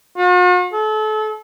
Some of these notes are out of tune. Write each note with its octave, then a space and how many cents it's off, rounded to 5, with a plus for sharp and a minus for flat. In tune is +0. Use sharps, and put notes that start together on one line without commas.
F#4 -45
A4 -35